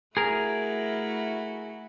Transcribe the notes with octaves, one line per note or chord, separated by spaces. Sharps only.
A3 E4 F#4 G#4 A#4